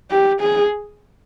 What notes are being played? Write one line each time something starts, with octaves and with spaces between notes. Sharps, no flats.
G4
G#4